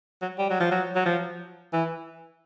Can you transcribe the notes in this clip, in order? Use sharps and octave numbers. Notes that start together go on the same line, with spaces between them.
F#3
G3
F#3
F3
F#3
F#3
F3
E3